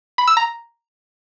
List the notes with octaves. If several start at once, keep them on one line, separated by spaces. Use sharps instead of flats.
B5
E6
A#5